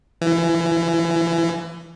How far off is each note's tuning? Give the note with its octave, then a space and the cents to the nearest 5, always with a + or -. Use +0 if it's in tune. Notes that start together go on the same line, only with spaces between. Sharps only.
E3 +25